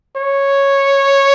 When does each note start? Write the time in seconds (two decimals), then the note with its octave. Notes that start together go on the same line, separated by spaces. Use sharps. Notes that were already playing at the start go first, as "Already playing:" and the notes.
0.16 C#5